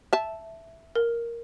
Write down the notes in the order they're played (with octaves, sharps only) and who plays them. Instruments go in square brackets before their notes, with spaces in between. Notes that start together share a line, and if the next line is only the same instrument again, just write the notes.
[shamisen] E5 A5
[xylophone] A#4